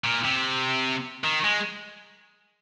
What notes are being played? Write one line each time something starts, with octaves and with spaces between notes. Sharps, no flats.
A#2
C3
D#3
G#3